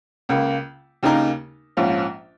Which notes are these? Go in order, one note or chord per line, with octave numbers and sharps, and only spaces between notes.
C#2 C#3 A#3
D#2 C#3 A#3 D#4 A#4
A#1 G#2 F3 C#4 F4